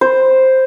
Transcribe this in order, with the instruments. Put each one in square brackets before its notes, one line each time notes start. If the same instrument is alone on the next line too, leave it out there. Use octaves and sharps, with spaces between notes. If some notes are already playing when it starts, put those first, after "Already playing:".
[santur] C5